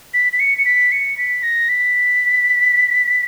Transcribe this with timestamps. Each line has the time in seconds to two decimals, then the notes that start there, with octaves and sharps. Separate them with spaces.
0.14 B6
0.33 B6
0.40 C#7
0.58 C#7
0.65 B6
0.92 C#7
1.18 B6
1.43 A#6
1.69 B6